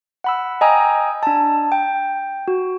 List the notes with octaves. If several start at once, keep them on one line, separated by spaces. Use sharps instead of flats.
F#5 B5 E6
D#5 G5 G#5 A#5 D#6 E6
D4 A5
G5
F#4